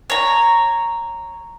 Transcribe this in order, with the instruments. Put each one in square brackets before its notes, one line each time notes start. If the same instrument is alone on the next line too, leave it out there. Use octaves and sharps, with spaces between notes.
[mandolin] C#5 A#5